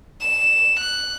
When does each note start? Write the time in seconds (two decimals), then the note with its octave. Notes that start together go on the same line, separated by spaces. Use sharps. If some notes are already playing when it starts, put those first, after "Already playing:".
0.21 E7
0.80 F#6